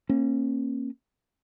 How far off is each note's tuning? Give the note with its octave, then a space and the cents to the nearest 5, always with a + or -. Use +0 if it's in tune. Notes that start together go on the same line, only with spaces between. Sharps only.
A#3 +0 C#4 -30